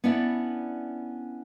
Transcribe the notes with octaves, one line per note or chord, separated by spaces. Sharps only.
B3 C#4 D4 E4 D5 E5